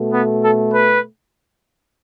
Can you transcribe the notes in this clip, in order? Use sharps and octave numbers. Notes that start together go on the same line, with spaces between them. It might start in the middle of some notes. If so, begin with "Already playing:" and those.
Already playing: B2 A3
B3
A4
B4